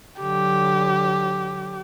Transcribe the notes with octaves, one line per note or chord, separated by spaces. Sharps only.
D3 F#3 G4